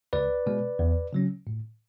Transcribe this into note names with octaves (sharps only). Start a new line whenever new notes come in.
C#2 B4 D5
B2 G#3
E2
C#3 F#3 C#4
A2